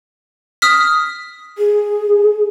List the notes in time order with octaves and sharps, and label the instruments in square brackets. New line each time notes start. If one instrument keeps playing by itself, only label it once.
[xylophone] D#6 F6 B6
[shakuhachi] G#4